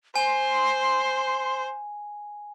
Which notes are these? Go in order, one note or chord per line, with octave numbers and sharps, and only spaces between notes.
C5 G#5 C6